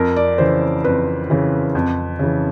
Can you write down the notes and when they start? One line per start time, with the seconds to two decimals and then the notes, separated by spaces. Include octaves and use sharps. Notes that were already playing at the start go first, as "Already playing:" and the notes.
Already playing: F2 A#4
0.16 D5
0.38 C#3 E3 C5
0.84 F2 B4
1.30 C#3 E3
1.75 F2
2.19 C#3 E3